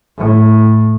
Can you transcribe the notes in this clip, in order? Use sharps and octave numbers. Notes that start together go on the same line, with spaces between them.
A2